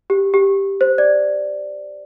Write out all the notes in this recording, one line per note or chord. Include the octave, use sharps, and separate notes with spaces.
G4
G4
C5
D5